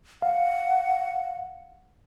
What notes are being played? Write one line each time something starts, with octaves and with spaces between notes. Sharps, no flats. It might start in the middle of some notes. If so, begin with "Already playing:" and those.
F5 F#5